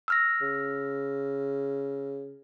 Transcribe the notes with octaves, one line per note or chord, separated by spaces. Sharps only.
E6 F6 A#6
C#3